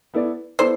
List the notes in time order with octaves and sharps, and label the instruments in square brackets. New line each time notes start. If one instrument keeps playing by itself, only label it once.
[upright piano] B3 E4 A4 D5
[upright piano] B3 E4 A4 D5 [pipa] C5